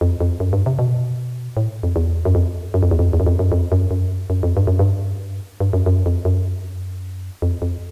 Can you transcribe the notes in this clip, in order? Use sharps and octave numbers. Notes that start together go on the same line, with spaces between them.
F2
F2
F#2
G2
C3
B2
A2
F2
E2
F#2
F2
F#2
F2
E2
F2
E2
F#2
F2
F#2
F2
F#2
F#2
F#2
F2
G2
F#2
G2
G2
F#2
F#2
F2
F#2
F2
F2